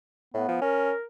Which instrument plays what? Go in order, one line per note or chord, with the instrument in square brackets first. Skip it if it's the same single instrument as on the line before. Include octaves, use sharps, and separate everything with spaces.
[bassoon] A2 [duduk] B3
[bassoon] F3
[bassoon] C#4 [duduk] A#4